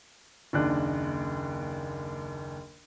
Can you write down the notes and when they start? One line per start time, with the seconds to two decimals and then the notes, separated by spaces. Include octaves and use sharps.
0.53 F#1 D#2 D4 F#6